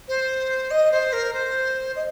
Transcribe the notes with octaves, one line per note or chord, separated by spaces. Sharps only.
C5
D#5
C5
A#4
C5
D#5